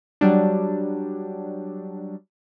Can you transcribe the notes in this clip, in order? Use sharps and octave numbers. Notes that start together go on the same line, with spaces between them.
F#3 G3 D4